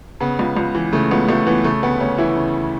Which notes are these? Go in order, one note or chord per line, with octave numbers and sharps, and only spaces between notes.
C#3 B3
C#2
C#2
E3
C#3 A3
C#2 B3
C#2 A3
E3 B3
C#3 A3
D2 B3
D2 C#4
E3 E4
C#3